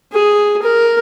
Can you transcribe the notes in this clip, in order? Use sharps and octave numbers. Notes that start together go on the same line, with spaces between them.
G#4
A#4